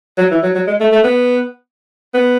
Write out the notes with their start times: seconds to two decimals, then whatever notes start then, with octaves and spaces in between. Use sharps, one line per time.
0.18 F#3
0.31 E3
0.43 F#3
0.55 F#3
0.67 G#3
0.80 A3
0.92 A3
1.04 B3
2.14 B3